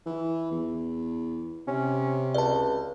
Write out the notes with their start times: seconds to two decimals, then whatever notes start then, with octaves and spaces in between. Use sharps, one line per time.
0.06 E3
0.51 E2
1.67 C3 C#4
2.34 C#2 D5 A5